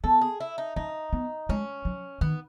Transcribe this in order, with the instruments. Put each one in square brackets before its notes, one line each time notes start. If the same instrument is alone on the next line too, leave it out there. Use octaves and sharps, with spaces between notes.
[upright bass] B3 [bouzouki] A4
[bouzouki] G#4
E4
D#4
[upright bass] C#4 [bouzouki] D#4
[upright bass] B3
[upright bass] G#3 [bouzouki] C#4
[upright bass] F#3
[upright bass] D#3 [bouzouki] B3